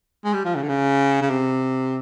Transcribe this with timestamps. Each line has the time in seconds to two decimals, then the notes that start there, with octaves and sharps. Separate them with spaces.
0.25 G#3
0.34 G3
0.45 F3
0.56 C#3
0.62 D3
0.69 C#3
1.22 C#3
1.30 C3